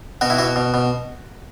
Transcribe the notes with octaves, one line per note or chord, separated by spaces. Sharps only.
B2 F#4
E4
B2 F#4
B2
B2